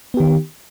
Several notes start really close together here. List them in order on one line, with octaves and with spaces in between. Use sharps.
B3 G4 D#3